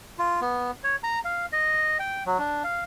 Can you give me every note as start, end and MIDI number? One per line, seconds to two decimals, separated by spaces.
0.19 0.41 65
0.41 0.71 59
0.84 0.96 73
1.03 1.19 82
1.25 1.46 77
1.52 1.98 75
1.99 2.24 79
2.26 2.38 54
2.38 2.63 62
2.64 2.84 77